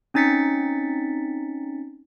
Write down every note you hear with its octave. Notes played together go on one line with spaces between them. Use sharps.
C4 C#4 D#4 A6 B6 C#7